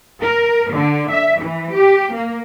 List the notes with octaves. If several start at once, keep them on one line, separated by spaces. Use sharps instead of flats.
A#4
D3
E5
E3
G4
A#3